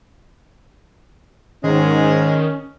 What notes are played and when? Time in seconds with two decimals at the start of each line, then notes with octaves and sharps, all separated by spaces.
1.64 G#2 D#3 G#3 C#4